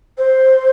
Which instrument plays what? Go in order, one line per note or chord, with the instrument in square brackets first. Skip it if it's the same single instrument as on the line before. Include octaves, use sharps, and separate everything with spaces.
[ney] C5